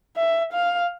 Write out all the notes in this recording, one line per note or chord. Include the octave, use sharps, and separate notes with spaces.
E5
F5